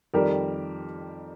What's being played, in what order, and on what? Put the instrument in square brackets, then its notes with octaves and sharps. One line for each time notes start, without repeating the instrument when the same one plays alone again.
[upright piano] F2 D#3 G3 G4 A#4